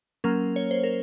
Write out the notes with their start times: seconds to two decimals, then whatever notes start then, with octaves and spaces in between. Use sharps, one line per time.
0.24 F#3 A#3 C#4 A#4
0.56 C#5
0.71 C5
0.83 A#4